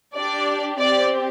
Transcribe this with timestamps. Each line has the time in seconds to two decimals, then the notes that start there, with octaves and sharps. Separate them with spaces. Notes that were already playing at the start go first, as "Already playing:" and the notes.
0.18 D4 G4 D5
0.81 C4 G4 D5